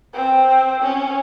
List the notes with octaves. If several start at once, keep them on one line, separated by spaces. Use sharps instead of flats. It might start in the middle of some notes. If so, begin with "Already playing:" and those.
C4
C#4